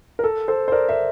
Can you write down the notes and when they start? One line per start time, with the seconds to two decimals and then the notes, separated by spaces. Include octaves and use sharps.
0.19 A#4
0.24 A4
0.48 A4 C5
0.68 C5
0.72 A#4 D5
0.89 C5 E5